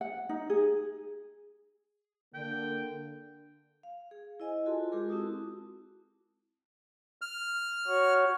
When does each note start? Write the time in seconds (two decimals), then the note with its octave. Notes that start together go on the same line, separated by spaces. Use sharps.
0.01 F#5
0.29 D#4
0.50 G#4
2.34 D3 A#3 G5
3.83 F5
4.11 G#4
4.40 E4 C5 D#5 G#5
4.66 F4 F#4 G#4 A4 A5 C6
4.92 G#3 F4 G4 G#4 A#4 D6
5.09 C4 E4 F#4 A5 D#6
7.22 F6
7.87 F#4 C#5